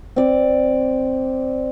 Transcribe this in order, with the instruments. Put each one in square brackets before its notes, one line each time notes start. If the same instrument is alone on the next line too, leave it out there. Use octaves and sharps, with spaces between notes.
[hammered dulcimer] C4 D5